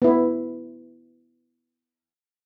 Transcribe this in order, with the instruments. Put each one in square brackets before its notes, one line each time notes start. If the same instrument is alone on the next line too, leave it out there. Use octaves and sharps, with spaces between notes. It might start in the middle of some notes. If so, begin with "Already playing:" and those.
[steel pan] B3 E4